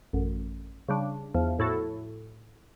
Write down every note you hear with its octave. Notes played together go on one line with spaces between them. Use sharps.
A1 F#2
C#3 G3 D4
E2 F3
A2 E4 F#4 A4